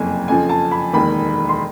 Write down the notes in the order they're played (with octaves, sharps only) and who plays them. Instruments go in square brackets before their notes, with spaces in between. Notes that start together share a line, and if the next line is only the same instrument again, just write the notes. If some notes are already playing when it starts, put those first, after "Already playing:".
Already playing: [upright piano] F#1 F2 C3 G#5
F2 C#3 F3 G#5
A5
B5
E1 D#2 D#3 B5
C6